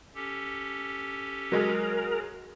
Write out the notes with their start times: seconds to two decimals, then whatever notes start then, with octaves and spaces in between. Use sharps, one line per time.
0.15 C#4 G4 A4
1.52 F#3 G#3 G#4 A#4